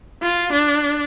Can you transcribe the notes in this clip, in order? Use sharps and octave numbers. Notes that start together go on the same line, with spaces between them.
F4
D4